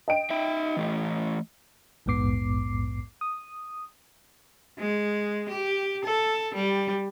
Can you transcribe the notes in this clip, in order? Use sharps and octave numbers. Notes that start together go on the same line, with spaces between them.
D#5 G5 D7
D#4 E5
E3 A3
A#1 E2 G#2 B3 D6 C7
D#6
G#3
G4
A4
G3